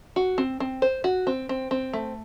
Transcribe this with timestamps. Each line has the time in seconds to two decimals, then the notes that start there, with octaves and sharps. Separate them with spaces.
0.16 F#4
0.38 C4
0.60 C4
0.82 C5
1.04 F#4
1.27 C4
1.49 C4
1.71 C4
1.93 A3